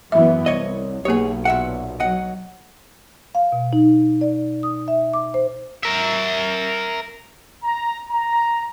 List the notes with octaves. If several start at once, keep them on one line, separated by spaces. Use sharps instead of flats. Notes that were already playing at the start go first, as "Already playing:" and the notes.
F#2 E3 B3 E5
C2 C#5 D#5
B1 B2 A#3 G4 G#4 C#5
A#2 E5 F#5
F#3 D#5 F#5
F5
B2
D#4
D5
D#6
E5
D6
C5
A#4 E5
A#5
A#5